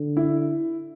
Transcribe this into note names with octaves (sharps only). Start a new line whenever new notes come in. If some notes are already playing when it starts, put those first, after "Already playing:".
Already playing: D3
E4